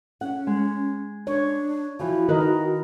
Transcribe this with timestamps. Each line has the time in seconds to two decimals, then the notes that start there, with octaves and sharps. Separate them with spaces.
0.21 C#4 F#5
0.47 G#3
1.27 D4 C#5
1.99 E3 F3 F#4
2.29 D#3 A#4 B4 D#5